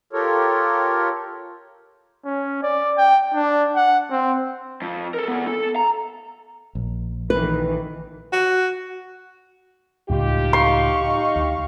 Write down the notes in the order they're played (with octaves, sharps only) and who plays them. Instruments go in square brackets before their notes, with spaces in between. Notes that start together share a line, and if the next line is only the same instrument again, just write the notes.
[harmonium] F4 G4 A4 A#4 C#5
[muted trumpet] C#4
D5
G5
D4
F#5
C4
[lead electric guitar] F2
A4 A#4
E3 B3
A4
A#5
[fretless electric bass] A#1
[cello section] D#3 E3 [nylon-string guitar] B4
[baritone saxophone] F#4
[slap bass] C#2 A2 G3 [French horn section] D#4 F4 G4
[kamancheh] F5 C#6 [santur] C6
[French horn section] D#4 G4
[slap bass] D2